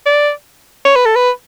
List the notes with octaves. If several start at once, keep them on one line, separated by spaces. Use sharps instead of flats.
D5
C#5
B4
A4
B4